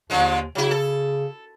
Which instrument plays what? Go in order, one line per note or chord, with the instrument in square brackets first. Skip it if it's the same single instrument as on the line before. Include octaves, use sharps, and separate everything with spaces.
[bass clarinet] D#2 [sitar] D3 F3 G#3
[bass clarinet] C#3 [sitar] F#3 E4
[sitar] A4